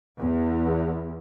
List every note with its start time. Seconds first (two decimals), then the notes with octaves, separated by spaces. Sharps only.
0.19 E2